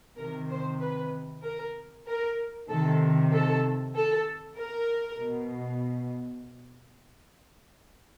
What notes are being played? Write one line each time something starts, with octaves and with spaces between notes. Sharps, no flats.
C3 D#3 A#4
C5
B4
A#4
A#4
C3 D#3 A4
A4
A4
A#4
B2